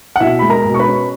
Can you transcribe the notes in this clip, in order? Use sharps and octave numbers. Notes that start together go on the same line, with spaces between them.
F#5
B2 E4 E5
G#3 B5
A#4 A#5
B2
C#6
B4 B5
C#4